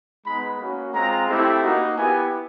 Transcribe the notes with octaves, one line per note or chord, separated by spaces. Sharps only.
G#3 B3 D#4 B5
A#3 C#4 F#4
G#3 C4 F4 A#5
A3 C4 E4 G4
A#3 D#4 F#4
B3 E4 G4 G#5